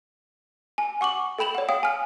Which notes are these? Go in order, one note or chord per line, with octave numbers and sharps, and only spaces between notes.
G#5
F#5 C#6 D6 F#7
A4 G5 B5 E7 F#7
C#5 F#5
F5 G5 D#6
G#5 F6